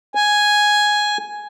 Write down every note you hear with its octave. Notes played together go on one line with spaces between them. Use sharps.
G#5